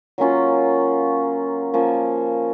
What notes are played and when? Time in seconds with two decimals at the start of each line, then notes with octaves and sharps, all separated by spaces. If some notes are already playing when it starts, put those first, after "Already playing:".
0.18 F#3 A#3 C#4 F4
1.74 F3 A#3 C#4